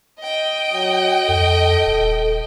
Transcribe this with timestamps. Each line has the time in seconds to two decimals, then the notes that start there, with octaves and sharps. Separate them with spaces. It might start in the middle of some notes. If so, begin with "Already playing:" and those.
0.20 D#5 G5
0.73 F#3
1.28 F2 A4
1.86 D#1